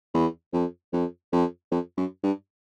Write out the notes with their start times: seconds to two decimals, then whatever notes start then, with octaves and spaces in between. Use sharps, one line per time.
0.14 E2
0.53 F2
0.93 F2
1.32 F2
1.71 F2
1.97 F#2
2.23 G2